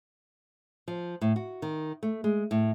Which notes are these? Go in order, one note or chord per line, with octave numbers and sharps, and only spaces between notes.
F3
A2
F#4
D#3
A3
G#3
A2